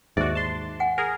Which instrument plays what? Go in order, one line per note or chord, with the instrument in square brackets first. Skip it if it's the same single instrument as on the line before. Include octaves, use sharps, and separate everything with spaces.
[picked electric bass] D#2 G#2 [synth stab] F#4 D5 [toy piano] E5
[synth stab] A5 C6
[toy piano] F#5 G#5
[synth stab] G#4 A#4 [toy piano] G#5